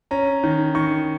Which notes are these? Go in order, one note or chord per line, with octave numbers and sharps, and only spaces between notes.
C#4 A#5
D#3
D#3 C#6